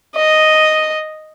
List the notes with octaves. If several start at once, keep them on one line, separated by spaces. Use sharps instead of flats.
D#5